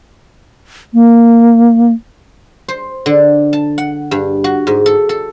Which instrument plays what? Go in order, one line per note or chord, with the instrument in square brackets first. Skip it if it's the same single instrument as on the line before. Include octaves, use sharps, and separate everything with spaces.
[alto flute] A#3
[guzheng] C5
D3
A5
F#5
G2
F#4
G#2
A4
A4